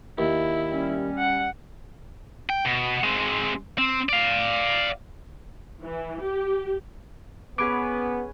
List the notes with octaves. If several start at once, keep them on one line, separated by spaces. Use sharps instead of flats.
D#2 E4
G3 C#4
F#5
G5
B2
G#3 C4
C4
D5 F5
E3
G4
B3 C#4 G#4 B4 D6 D7